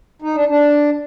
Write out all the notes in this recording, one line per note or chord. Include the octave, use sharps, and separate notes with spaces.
D#4
D4
D4